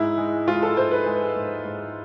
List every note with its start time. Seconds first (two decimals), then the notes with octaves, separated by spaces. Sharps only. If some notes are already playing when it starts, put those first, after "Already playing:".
Already playing: G#2 E4
0.18 G#3
0.48 G#3 F4
0.63 A4
0.77 G#2 C5
0.91 B4
1.06 G#3
1.36 G#2
1.65 G#2